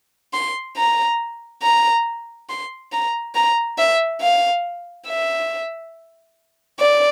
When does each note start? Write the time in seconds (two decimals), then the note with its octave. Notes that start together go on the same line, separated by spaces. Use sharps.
0.33 C6
0.77 A#5
1.63 A#5
2.49 C6
2.92 A#5
3.35 A#5
3.79 E5
4.21 F5
5.07 E5
6.80 D5